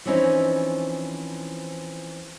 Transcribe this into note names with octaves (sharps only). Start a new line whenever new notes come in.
E3 F3 C4 C#4 D#4 E4